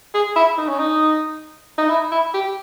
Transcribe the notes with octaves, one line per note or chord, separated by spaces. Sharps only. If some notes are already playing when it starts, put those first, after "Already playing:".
G#4
E4
D#4
C#4
D#4
D#4
E4
E4
G4